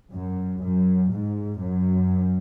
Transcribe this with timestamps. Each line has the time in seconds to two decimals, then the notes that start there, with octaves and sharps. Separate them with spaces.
0.12 F#2
0.63 F#2
1.12 G#2
1.61 F#2